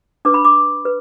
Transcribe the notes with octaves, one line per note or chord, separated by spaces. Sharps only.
D4 B4 D6
B5
D6
B4